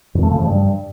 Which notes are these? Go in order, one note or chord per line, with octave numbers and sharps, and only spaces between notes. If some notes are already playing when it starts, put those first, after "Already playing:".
F2
A3
C#3
F3
G2